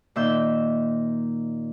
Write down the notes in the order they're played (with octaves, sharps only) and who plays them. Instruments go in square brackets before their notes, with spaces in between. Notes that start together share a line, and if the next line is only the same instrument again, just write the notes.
[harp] A#2 D#3 E5 E6 G6